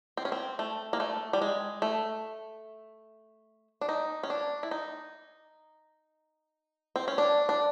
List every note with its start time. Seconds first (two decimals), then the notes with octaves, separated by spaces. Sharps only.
0.17 C4
0.25 C#4
0.32 C4
0.59 A3
0.93 A#3
1.00 A3
1.33 G3
1.42 G#3
1.82 A3
3.81 D4
3.89 D#4
4.23 C#4
4.30 D4
4.63 E4
4.71 D#4
6.96 C4
7.08 C#4
7.18 D4
7.49 D4